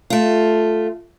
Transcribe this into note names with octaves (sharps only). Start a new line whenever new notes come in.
A3 F4